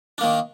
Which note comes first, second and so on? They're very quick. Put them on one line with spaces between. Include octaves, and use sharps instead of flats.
D4 A#3 D#3